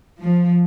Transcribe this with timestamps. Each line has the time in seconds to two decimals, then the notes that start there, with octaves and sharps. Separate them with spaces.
0.20 F3